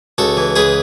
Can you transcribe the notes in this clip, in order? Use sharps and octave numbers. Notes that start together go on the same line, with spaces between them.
C#2 F#4 A4
E3
C#2 G#4 B4